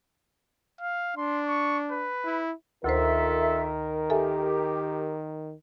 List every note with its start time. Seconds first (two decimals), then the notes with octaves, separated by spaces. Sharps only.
0.81 F5
1.17 D4 C6
1.47 C#6
1.91 B4
2.25 E4
2.84 D2 D#3 F4 A4 A#4 C5 E5
4.10 G4 A4 E5 G#5